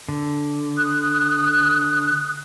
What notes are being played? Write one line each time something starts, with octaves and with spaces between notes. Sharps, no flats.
D3
D#6 F#6